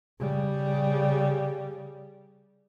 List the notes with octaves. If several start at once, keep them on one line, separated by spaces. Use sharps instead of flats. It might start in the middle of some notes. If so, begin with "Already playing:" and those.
C#3 G3